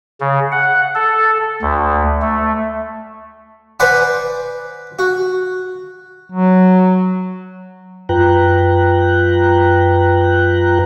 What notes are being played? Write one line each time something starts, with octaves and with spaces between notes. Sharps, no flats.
C#3
F#5
A4
D2
A3
B4 C5 D5 F#5 G#5
F#4
F#3
F#2 F4 B4 G5 A#5 F#6